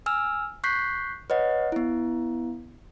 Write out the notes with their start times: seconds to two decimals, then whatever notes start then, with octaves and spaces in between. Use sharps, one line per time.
0.06 G#5 E6 F6
0.64 C#6 F#6 G6 B6 C7
1.30 B4 C#5 D#5 F#5
1.72 B3 E4